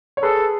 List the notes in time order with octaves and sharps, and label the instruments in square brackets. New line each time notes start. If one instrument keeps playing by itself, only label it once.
[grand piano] C#5
[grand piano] G#4 B4 [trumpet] A4